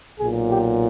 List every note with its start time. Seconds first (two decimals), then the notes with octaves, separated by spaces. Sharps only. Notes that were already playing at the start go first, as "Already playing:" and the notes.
0.19 B1 A#2 F#3 G#4
0.51 G4